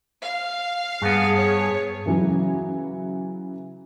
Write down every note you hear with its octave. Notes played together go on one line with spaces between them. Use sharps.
F5
G2 B3 G#4
C#5
C#3 E3 F#3